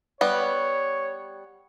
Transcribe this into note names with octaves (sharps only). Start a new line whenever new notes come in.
G3 B3 B4 C#5